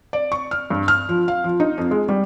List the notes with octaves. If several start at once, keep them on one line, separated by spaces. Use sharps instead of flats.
D5
C#6
F6
G2
F6
F3
F5
F3
D#4
F2
G#3
G3